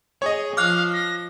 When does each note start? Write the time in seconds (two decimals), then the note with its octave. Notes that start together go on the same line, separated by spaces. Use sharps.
0.22 G#4 C#5 D#5
0.57 F3 F5 D6 F6 F#6
0.93 A#6